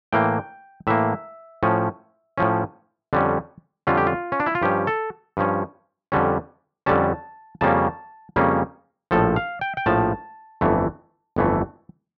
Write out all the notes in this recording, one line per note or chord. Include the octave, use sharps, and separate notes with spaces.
A2 E3 A#3 G5
A2 E3 A#3 E5
A2 F3 C#4
A2 F3 C#4
F2 D3 G3 C#4
F2 D3 G3 C#4 F4
G4
F4
C#4
D4
E4
F4
G2 F3 C#4 G4
A4
G2 F3 C#4
F2 D3 G3 C#4
F2 D3 G3 C#4 A5
F2 C#3 G3 A#3 C#4 A5
F2 C#3 G3 A#3 C#4
A#1 A2 F3 A4
F5
G5
G5
A#1 A2 F3 A5
G1 F2 E3 A3
G1 F2 E3 A3